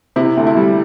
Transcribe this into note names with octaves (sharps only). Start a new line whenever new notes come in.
C3 E4
D2
E4
G3